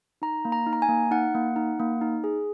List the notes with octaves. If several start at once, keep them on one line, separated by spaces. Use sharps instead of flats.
D#4 A#5
A#3
A#5
D#4
A#5
G#5
A#3
D#4 F#5
A#3
D#4
A#3
D#4
G#4